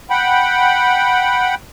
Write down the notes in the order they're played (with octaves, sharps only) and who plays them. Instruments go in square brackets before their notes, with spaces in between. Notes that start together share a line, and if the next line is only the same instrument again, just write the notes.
[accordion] F#5 G5 B5